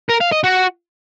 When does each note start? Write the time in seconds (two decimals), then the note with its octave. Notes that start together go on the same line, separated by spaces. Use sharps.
0.09 A#4
0.21 F5
0.32 D#5
0.44 F#4